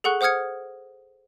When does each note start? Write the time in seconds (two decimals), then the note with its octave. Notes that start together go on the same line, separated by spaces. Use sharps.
0.04 G#4 A4 F#5 C#6 F#6
0.21 C5 F#5 D#6 F6 G#6 C#7